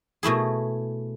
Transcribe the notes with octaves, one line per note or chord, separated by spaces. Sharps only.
B2 A3 E4 G#4